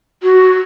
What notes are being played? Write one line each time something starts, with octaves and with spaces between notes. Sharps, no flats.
F#4